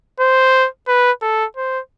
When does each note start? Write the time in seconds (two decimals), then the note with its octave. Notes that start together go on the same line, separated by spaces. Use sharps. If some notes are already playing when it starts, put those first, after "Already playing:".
0.20 C5
0.88 B4
1.22 A4
1.56 C5